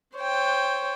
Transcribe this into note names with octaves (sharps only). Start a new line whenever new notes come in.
C5 C#5 G5